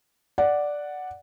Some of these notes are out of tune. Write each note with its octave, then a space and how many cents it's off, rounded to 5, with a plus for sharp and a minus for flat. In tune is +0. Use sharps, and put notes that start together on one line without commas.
D5 +0 F#5 +0